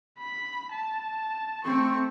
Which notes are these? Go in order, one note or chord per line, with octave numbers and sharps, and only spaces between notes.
B5
A5
A3 C4 C#6